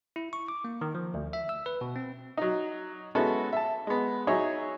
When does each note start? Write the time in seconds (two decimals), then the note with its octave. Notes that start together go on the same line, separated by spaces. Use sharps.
0.16 E4
0.33 C#6
0.48 D6
0.64 A#3
0.81 D#3
0.95 F3
1.14 D2
1.33 E5
1.49 E6
1.66 B4
1.81 B2
1.96 C4
2.38 F#3 D#4
3.15 G#3 B3 C#4 E4 F#4 A4
3.53 E5 A5
3.87 G#3 B3
4.27 F#3 D#4 G#4 C#5 E5